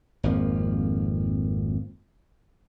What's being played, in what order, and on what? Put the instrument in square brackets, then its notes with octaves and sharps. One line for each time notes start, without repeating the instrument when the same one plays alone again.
[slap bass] G#1 F2 F3 A#3